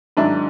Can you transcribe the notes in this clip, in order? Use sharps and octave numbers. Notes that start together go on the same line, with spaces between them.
G#2 D#3 F#3 D4 E4